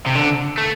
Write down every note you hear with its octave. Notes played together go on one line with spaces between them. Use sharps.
C3
D3
A3